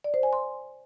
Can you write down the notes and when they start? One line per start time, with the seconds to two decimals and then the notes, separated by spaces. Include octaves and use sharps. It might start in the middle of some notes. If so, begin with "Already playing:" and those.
0.04 D5
0.14 C5
0.23 G#5
0.33 C6